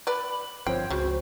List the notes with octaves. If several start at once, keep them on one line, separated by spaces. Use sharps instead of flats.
B4 D5 B5
G1 F3 C4 C5 C#5 G5
C#2 C#3 F#4